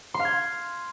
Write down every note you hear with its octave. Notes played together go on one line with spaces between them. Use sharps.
C6
F5
G#6